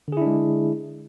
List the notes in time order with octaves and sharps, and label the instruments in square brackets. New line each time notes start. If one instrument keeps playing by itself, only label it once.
[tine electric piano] D3
G#4
E4
D4
G#3